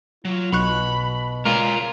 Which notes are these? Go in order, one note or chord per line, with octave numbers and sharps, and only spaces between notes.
F#3 F4
B1 B2 B5 C#6 F#6
G#3 F4 A#4 C#5